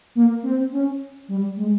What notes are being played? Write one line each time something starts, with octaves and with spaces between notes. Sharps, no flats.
A#3
C4
C#4
G3
G#3